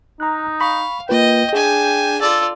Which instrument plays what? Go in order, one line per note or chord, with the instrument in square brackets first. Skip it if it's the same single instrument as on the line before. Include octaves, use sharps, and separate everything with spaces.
[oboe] D#4 [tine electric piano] A#5 F#6
[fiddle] F5 [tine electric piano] B5 C#6
[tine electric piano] A#3 F4 B4 [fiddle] D#5 [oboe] G5
[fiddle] D4 G#5 [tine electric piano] G#4
[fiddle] F4 D5 [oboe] A4